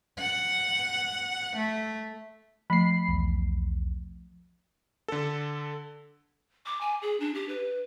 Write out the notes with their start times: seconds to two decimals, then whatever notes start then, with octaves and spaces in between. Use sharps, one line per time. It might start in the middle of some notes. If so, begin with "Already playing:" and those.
0.18 F#5
1.56 A3
2.70 F3 A3 B5 C7
3.08 B1 E2
5.08 D3 A4
6.66 D6
6.81 G#5
7.02 G#4
7.20 D4
7.35 G4
7.49 B4